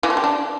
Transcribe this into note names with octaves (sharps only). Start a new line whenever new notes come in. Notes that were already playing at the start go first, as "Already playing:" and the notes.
E3
F3
G4
D4